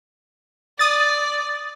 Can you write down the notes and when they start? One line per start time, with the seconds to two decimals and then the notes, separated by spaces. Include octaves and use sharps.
0.79 D5 D#6 A6